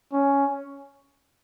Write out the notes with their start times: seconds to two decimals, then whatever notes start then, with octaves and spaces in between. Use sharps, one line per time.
0.13 C#4